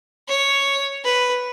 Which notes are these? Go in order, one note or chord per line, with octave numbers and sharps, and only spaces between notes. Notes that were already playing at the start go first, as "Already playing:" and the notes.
C#5
B4